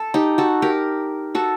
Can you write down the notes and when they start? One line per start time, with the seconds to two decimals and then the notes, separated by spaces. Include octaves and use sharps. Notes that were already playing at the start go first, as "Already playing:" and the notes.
Already playing: A4
0.14 D#4 G4
0.38 F#4 A4
0.62 G4 A#4
1.35 F#4 A4